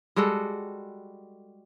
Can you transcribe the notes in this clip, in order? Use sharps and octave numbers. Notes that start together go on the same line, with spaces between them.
G3 G#3 F#4 A4